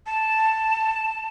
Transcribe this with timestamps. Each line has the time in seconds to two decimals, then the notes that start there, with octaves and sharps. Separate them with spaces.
0.06 A5